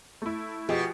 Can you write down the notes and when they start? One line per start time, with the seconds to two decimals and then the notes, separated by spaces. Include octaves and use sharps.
0.22 A3 E4
0.69 B2 F3 G4 G#4